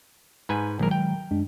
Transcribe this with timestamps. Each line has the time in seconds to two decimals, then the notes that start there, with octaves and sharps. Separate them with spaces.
0.49 G#2 B4 G#5
0.79 A#1 D#3 F#3 G#3 A#4
0.91 G5
1.31 F#2 G#3 D4